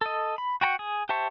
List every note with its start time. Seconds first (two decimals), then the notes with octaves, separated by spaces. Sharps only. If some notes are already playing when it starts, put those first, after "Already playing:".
0.01 A4 D#5
0.38 B5
0.61 F#4 G5 A#5 C#6
0.79 G#4
1.09 G4 C5 E5 A5 C#6